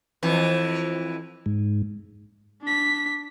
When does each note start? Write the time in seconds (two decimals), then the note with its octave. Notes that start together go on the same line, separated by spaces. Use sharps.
0.23 F2 E3
1.46 G#2
2.62 D4 B6